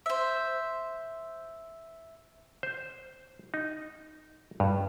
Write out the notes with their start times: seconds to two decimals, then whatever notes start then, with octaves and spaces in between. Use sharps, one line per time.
0.06 C5 E5
2.63 C5
3.54 D#4
4.60 G2